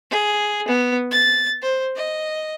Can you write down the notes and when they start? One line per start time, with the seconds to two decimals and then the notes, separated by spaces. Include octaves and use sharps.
0.10 G#4
0.67 B3
1.11 A6
1.62 C5
1.96 D#5